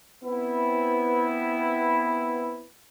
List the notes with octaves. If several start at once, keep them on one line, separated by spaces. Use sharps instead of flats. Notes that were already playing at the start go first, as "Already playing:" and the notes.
B3 C4 E4